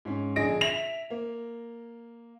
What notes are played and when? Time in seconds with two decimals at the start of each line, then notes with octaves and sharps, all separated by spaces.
0.05 G#2 C#4
0.36 A#1 D3 G#4 D#5 A#6 D7
0.61 E5 A#6 F7
1.10 A#3